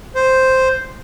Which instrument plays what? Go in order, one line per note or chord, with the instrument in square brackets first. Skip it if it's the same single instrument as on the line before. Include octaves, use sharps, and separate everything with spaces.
[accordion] C5